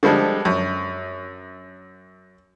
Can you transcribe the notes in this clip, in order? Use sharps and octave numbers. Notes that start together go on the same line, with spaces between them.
D3 F3 G3 G#3
F#2